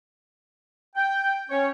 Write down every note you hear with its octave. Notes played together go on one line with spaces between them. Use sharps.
G5
C#4 C#5